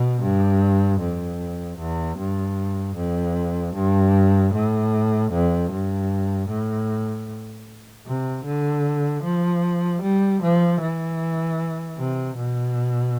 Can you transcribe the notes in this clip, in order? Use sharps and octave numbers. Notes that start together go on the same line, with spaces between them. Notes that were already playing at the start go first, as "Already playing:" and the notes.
Already playing: B2
G2
F2
E2
G2
F2
G2
A2
F2
G2
A2
C3
D3
F3
G3
F3
E3
C3
B2